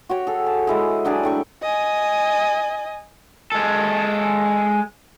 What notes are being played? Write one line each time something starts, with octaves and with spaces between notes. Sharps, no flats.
F#4 G4 C#5
G#4 A4
A5
G#3 E4 G#4
F#3 D4 G4 G#4
A2 G5 C#6
D#5 G#5
G#3 A4